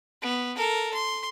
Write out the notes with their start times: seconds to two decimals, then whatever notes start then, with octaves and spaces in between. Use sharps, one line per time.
0.22 B3
0.57 A4 A#4
0.94 C6